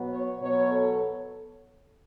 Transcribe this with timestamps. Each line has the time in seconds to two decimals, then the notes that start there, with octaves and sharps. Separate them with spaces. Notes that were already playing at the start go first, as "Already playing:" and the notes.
Already playing: B2 F#3 B3
0.10 C#5
0.40 B2 F#3 B3 C#5
0.71 A4